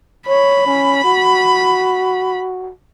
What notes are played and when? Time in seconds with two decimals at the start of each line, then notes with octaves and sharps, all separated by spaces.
0.28 C#5 B5
0.66 C#4
1.04 F#4